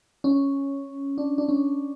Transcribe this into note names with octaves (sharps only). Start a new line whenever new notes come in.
C#4
D4
D4
C#4